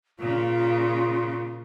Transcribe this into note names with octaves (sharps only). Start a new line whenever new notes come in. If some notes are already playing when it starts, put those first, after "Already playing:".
A#2 C#3 F4